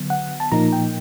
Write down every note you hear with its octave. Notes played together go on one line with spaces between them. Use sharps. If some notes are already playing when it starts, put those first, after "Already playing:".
Already playing: D3 F#3 B3
F#5
A5
A#2 F3 A#3 D#4 A#5
G5